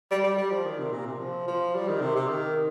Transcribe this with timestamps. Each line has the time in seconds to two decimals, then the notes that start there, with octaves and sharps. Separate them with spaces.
0.11 G3
0.23 G3
0.38 G3
0.51 F3
0.65 D#3
0.79 C3
0.92 A#2
1.06 C3
1.19 F3
1.48 F3
1.75 G3
1.88 D#3
2.01 C3
2.16 C3
2.29 D#3